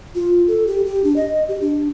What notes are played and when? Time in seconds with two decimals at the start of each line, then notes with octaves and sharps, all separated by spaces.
0.15 F4
0.48 A4
0.67 G4
0.86 G4
1.04 D4
1.16 D#5
1.48 G4
1.61 D4